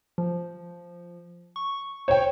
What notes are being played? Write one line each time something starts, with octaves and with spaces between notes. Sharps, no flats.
F3
C#6
C5 C#5 G5